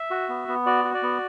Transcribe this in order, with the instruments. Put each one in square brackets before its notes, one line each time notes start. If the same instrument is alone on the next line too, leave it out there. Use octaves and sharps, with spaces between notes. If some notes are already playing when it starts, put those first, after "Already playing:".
Already playing: [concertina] E5
F#4
B3
B3
F#4 D5
F#4
D5
B3